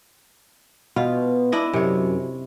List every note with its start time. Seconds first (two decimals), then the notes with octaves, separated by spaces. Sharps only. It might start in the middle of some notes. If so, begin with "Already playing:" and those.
0.96 B2 F4
1.52 D4 E4 D#5
1.73 F#2 C3 C#5